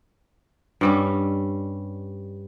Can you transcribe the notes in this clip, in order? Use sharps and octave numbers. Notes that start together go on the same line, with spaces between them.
G2 G3 C#4